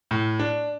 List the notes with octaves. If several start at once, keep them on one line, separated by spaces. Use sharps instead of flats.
A2
D4